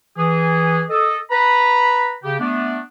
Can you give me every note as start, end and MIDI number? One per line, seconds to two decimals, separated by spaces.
0.17 0.82 52
0.17 0.82 68
0.89 1.17 69
0.89 1.17 75
1.30 2.13 71
1.30 2.13 82
1.30 2.13 83
2.23 2.36 49
2.23 2.36 67
2.40 2.78 57
2.40 2.78 59
2.40 2.78 62